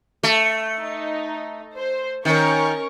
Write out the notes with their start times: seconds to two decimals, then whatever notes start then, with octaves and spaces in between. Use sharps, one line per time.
0.23 A3
0.80 D#4
1.77 C5
2.25 D#3 C#4 A#4 C#6